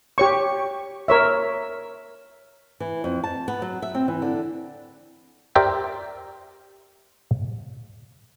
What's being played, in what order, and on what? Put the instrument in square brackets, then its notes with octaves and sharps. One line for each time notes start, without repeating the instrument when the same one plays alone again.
[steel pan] G4 C#5 C#6
A#4 C#5 E5
[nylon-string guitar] E3
F2
A5
B3
F#3
E5
C4
E3
D3
[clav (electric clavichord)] G4 A#4 C5 D5 E5 G5